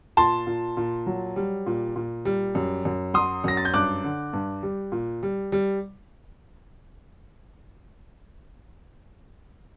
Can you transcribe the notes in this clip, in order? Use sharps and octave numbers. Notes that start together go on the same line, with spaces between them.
A#2 A5 C6
A#2
A#2
F#3
G3
A#2
A#2
G3
F#2
F#2
F#3 C6 D#6
F#2 A#6
A6
G6
G2 D6 F#6
D3
G2
G3
A#2
G3
G3